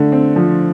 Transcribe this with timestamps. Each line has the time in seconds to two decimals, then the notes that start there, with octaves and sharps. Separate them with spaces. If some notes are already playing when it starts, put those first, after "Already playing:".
Already playing: D3 A3
0.12 C4
0.36 F3